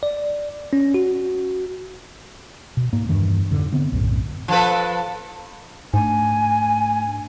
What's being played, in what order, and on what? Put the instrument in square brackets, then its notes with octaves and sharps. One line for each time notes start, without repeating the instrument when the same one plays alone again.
[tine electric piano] D5
C#4
F#4
[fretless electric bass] B2
G#2 A#3
E2 G2 D#3 E3
F2 G#2 D3
D3 B3 C4
B1 F#2 A2
[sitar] F3 A4 B4
[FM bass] G#2 [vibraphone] A3 D4 [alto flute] G#5